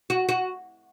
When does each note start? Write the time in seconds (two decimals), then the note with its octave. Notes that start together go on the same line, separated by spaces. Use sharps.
0.10 F#4
0.29 F#4